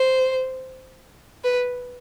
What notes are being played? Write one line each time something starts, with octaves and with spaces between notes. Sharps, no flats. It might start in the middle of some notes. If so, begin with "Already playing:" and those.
Already playing: C5
B4